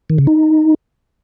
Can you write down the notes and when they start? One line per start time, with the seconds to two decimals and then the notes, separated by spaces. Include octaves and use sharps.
0.10 D#3
0.18 C#3
0.27 D#4